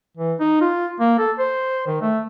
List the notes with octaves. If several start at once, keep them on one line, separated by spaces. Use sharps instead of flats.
E3
D#4
F4
A#3
A4
C5
D#3
A3